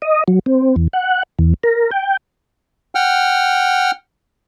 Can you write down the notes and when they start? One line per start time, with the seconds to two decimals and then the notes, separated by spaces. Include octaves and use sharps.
0.02 D#5
0.28 F#3
0.46 C4
0.76 E2
0.93 F#5
1.39 E2
1.63 A#4
1.91 G5
2.95 F#5 G5 F6